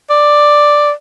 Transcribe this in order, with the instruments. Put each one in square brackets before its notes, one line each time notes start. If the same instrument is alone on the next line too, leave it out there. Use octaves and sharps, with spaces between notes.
[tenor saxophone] D5